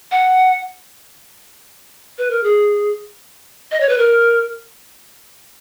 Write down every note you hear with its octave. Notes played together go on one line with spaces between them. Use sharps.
F#5
B4
A#4
G#4
D#5
C#5
B4
A#4